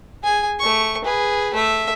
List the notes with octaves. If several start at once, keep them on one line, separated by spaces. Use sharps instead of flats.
G#4 G#5
A3 C#6
G#4 B4
A3 E5